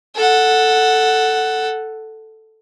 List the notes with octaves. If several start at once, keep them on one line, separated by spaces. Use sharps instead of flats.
A4 F#5